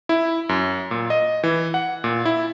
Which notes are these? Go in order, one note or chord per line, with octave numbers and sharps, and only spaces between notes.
E4
F#2
A#2
D#5
E3
F#5
A#2
E4